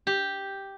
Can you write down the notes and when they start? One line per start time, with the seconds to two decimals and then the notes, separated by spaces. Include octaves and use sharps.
0.07 G4